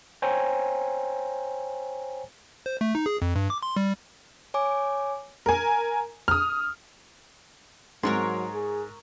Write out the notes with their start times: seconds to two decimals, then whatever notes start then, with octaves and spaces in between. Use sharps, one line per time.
0.22 C5 C#5 G5 G#5 A#5
2.66 C5
2.81 A3
2.95 D#4
3.06 G#4
3.22 F2
3.36 G2
3.50 D6
3.63 C6
3.76 G3
4.54 C#5 G#5 D6
5.46 A#4 G#5
6.28 D#6 F6
8.03 G#2 F#3 G#3 A#4 C#5 C6
8.54 G#4